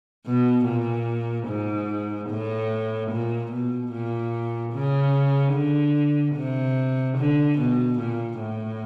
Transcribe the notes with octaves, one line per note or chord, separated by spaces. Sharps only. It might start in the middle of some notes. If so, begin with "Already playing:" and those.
B2
A#2
G#2
A2
A#2
B2
A#2
C#3
D3
C3
D3
B2
A#2
A2